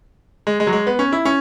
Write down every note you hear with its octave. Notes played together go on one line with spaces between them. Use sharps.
G#3
G#3
F#3
G#3
B3
C#4
E4
C#4